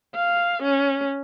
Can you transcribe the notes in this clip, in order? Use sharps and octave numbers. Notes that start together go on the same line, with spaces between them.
F5
C#4